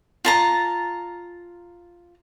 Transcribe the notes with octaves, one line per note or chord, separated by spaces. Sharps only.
F4 A5 A#5